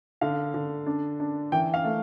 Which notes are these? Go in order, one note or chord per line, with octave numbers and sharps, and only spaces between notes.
D3 F5
D3
D4
D4
E3 G5
F5
A3